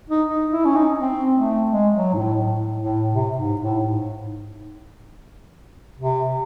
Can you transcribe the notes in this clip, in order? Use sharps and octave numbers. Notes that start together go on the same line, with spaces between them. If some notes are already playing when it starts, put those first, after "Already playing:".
D#4
D#4
E4
C#4
D#4
C4
A3
G#3
F#3
G#2
A2
A2
A2
C3
G#2
A2
G#2
C3